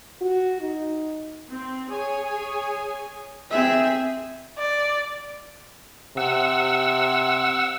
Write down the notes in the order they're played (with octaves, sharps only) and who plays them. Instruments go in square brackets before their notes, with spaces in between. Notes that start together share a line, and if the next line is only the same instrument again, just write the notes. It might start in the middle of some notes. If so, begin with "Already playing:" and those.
[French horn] F#4
D#4
[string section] C4
G#4 C#5 G#5
[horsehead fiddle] C4 E5 [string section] G#4
[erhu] D5
[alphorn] C3 [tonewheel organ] F#5 E6